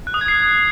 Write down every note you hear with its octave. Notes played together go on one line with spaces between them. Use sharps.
F#6
D#6
G#6
C7